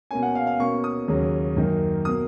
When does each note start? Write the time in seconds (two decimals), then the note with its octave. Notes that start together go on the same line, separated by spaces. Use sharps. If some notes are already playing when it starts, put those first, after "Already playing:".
0.11 B2 A#3 C#4 G#5
0.23 F#5
0.35 F5
0.47 F5
0.59 B2 A#3 C#4 C#6
0.84 D#6
1.08 D#2 C#3 F#3 C#4
1.56 F#2 D#3 A#3
2.05 B2 A#3 D#6